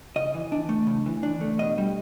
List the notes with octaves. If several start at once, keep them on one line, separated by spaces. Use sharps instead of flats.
C#3 D#5
E3
D4
A3
C#3
E3
D4
A3
B2 D#5
G3